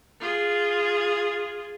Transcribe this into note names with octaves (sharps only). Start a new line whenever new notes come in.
F4 G#4